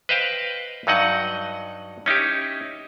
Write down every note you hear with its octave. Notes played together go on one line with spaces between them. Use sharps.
B4 C5 D#5 F5 G5
G2 F#3 D#4 D#5 F#5
C#4 D#4 E4 G4